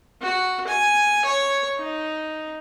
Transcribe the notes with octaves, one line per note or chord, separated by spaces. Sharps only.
F#4
G#5
C#5
D#4